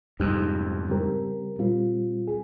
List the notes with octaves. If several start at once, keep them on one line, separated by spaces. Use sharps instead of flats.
F2 G#2 C3 G3 C4 D#4 G4
C#3 G3 C4 G4 A#4
A#2 G3 C4 F4
G#4